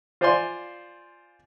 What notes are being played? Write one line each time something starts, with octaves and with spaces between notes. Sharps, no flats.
F4 C5 D5 F5 G#5 C6